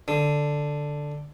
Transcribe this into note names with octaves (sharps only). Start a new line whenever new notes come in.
D3